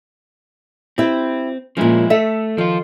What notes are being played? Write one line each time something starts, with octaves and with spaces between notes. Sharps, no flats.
C4 E4 G4
A#2 F3 G#3 C#4 E4
A3 A4 E5
D#3 F3 F4